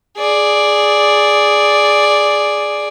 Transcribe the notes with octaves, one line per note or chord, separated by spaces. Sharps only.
G#4 D5